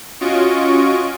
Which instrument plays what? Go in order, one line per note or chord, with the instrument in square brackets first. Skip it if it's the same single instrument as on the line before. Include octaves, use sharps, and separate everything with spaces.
[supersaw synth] C#4 F4 F#4 D#5 C#6 D7